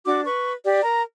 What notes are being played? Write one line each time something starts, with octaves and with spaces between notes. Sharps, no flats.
D4 F#4 D6
B4 C#6
G4 D5
A#4 A#5